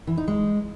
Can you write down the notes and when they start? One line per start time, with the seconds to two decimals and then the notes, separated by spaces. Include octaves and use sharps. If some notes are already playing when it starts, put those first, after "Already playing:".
0.07 E3
0.18 D#4
0.28 G#3